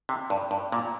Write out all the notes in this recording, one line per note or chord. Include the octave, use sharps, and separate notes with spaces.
C3
G2
G2
A#2